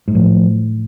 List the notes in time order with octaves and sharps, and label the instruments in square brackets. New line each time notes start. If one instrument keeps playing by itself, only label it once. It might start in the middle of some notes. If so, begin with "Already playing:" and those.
[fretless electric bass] G#2
[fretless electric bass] A2 [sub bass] F3